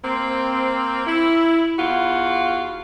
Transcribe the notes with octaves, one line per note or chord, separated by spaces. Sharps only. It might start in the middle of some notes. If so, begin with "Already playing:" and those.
A#3 C4
E4
E2 F4 F#4